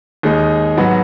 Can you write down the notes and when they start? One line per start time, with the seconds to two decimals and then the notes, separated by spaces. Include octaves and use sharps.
0.23 D#2 D#3 G#3 D#4
0.77 G#2 F#3 B3 F#4